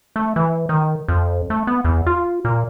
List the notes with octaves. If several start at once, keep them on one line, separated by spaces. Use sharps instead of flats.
A3
E3
D#3
F2
A3
B3
E2
F4
A#2